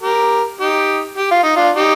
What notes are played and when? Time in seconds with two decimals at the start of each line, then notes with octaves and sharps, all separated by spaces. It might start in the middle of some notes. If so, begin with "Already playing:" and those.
0.02 G4 A#4
0.60 D#4 G4
1.18 G4
1.31 F4
1.43 D#4
1.56 D4 F4
1.75 D#4 G4